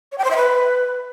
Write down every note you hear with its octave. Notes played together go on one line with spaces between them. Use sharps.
C#5
G5
C5
E5
B4